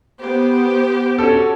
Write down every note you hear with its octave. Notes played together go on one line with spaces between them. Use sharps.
B3 G4 C5
C#4 F#4 A4